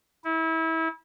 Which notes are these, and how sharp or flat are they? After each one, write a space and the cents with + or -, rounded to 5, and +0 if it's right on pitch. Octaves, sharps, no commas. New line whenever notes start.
E4 -30